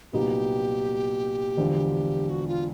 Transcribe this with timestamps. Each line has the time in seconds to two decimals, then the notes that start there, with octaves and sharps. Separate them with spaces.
0.13 C2 A#2 F#3 B3 D#4 G4
1.57 E1 D2 D3 F3
2.30 F#4
2.47 F4